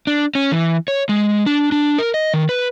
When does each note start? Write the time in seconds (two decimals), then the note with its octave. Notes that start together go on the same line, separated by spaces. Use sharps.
0.07 D4
0.35 C#4
0.52 E3
0.88 C#5
1.09 G#3
1.46 D4
1.72 D4
1.98 A#4
2.14 D#5
2.34 D#3
2.49 B4